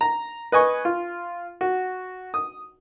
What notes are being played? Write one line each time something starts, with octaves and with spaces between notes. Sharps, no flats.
A#5
B4 D#5 G#5 C#6
F4
F#4
D#6